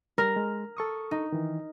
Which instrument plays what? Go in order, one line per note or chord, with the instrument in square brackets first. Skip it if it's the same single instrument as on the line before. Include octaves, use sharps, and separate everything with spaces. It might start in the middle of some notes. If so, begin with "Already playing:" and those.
[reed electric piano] G3 [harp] A#4
[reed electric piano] G#3
A4 C#6 D#6
[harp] D#4
[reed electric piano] D#3 E3